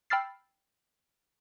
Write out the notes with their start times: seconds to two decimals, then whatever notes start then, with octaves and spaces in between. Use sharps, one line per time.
0.10 G5 B5 E6 F6 A6 C7